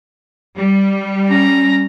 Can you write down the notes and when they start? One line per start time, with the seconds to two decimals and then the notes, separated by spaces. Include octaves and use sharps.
0.56 G3
1.30 C#4 A#5